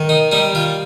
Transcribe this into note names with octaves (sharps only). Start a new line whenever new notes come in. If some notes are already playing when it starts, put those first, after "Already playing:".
Already playing: D#3
D#4
G3 D#4
F4